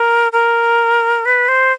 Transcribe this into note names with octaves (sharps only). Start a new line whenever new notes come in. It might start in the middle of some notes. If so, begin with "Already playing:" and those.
Already playing: A#4
A#4
B4
C5